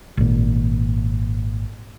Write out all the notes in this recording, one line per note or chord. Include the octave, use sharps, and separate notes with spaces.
G#1 A#2